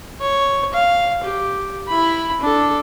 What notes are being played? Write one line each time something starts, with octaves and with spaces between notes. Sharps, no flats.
C#5
F5
G4
E4 B5
D4 A4